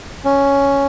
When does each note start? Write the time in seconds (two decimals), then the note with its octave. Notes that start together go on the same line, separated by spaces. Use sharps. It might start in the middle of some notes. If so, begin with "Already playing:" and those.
0.25 C#4